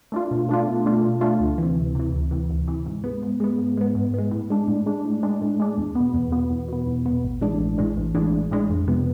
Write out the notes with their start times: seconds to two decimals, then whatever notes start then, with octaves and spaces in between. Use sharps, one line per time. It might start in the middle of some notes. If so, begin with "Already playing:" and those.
0.12 A3 D4 F4
0.31 B2
0.49 A3 D4 F4
0.67 B2
0.85 A3 D4 F4
1.03 B2
1.21 A3 D4 F4
1.40 D2
1.58 C3 E3
1.77 D2
1.95 C3 E3
2.13 D2
2.31 C3 E3
2.50 D2
2.67 C3 E3
2.86 G#2
3.04 G#3 B3
3.23 G#2
3.40 G#3 B3
3.59 G#2
3.77 G#3 B3
3.95 G#2
4.14 G#3 B3
4.31 A2
4.50 G#3 D4
4.68 A2
4.86 G#3 D4
5.05 A2
5.23 G#3 D4
5.42 A2
5.60 G#3 D4
5.77 E2
5.95 B2 B3
6.14 E2
6.32 B2 B3
6.51 E2
6.68 B2 B3
6.87 E2
7.06 B2 B3
7.24 A1
7.41 A2 E3 G#3 D4
7.60 A1
7.78 A2 E3 G#3 D4
7.97 A1
8.15 A2 E3 G#3 D4
8.32 A1
8.51 A2 E3 G#3 D4
8.70 F2
8.88 C3 F3 G#3 B3